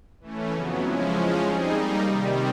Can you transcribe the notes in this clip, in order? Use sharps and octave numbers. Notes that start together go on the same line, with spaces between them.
E3 A3 C#4
F2 C#3 F#3 B3
F3 G#3 C#4 E4
F3 G#3 C#4
G3 C4 D#4 G#4
G3 A#3 D#4
C3 D#3 G3